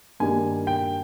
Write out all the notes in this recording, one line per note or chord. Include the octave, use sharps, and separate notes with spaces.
G2 D#3 G3 A#3 G#5
G5